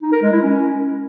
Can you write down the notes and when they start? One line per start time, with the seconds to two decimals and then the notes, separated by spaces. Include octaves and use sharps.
0.02 D#4
0.12 A#4
0.22 G#3
0.32 E4
0.42 C#4